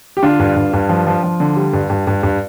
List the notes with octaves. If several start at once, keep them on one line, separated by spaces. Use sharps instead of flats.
G4
D3 D4 F4
G2
G2
G2
F3
F3
F3
D3
G3
G2
G2
G2
G2